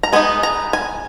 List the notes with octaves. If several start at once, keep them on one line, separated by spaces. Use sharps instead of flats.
A#5
G#3 B3 D#4 G#5
A#5
G#5